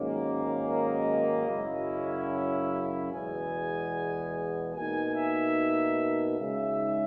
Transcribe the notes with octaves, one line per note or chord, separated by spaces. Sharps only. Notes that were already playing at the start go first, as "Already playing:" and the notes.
Already playing: G#2 D#3 F#3 A#3 C#4
D#5
F#2 C#3 F#3 C#4 E4
E5
E2 B2 G#3 B3 G#5
B2 A#3 D#4 G#5
E5
C#3 G#3 D#4 E5